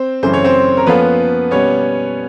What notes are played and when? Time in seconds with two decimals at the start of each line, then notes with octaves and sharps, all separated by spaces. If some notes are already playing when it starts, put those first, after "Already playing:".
Already playing: C4 C5
0.22 F#2 C#3 E3 A3 C#4 C5
0.33 C#5
0.44 C4 C5
0.77 A#4
0.86 F3 A#3 B3 C#4 F4 A4 B4
1.51 B2 G3 B3 C#4 C#5